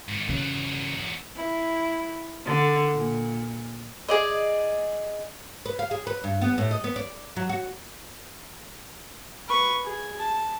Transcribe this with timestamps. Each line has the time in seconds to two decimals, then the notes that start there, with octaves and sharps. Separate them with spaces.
0.09 G#2 D#3
0.29 E2 C#3 F#3
1.36 E4
2.46 D3
2.93 A#2
4.09 G#4 D5 D#5
5.66 B4
5.79 F5
5.91 G#4
6.07 B4
6.24 G2
6.41 B3
6.58 A2
6.71 D#5
6.84 B3
6.96 D5
7.37 F#3
7.49 F#4
9.48 B4 C#6
9.84 G#4
10.20 A5